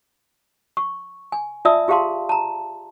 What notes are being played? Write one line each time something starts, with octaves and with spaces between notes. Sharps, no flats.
C#6
G#5
F4 D5 E5 A5 D#6 E6
F4 G4 G#4 F5 A5 C6
A5 A#5